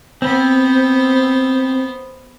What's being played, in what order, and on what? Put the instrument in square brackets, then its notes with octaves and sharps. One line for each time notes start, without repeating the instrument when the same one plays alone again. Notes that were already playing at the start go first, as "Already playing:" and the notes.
[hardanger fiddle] B3 C5 [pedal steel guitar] C4